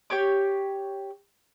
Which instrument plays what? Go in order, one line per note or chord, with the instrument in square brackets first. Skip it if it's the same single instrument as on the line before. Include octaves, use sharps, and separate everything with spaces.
[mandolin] G4 C#5 D6